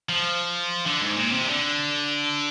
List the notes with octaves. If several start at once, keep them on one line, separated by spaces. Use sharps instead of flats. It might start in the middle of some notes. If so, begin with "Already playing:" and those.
F3
D3
G#2
A#2
C3
D3